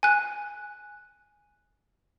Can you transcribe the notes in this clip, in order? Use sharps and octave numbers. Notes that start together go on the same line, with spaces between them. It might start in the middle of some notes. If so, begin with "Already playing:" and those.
G#5 F#6